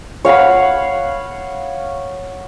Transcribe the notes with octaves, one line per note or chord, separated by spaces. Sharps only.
C#5 F5 F#5 B5